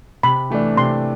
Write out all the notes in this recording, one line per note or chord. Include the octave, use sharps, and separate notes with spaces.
C3 B5
E3 A3 D4
C3 C6